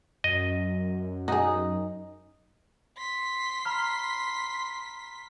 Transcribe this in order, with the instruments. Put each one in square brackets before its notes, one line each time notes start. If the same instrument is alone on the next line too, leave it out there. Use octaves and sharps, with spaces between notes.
[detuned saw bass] F#2 [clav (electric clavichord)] D#5
[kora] D#4 [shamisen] F#4 G#4
[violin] C6 B6
[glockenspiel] A#5 B5 F6